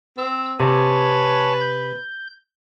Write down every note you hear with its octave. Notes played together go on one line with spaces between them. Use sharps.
C4 E6
C3 B4 C#5 G#5 A5
G6